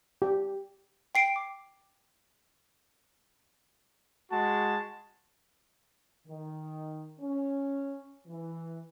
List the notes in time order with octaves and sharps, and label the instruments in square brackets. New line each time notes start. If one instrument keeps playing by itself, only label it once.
[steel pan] G4
[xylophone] G5 C7 D7
D6
[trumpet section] G#3 F#4 A5
[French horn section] D#3
C#4
E3